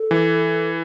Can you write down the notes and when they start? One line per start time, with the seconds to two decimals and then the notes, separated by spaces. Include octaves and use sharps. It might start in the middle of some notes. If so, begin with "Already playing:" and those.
Already playing: A4
0.11 E3